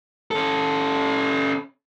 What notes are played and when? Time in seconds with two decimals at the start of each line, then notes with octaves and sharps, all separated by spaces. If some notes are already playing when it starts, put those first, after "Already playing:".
0.31 C#4 A4